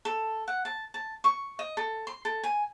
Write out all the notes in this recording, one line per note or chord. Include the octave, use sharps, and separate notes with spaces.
A4
F#5
A5
A5
C#6
D#5
A4
C6
A4
G#5